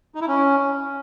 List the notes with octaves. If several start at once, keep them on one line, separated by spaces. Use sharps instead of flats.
D#4
E4
C#4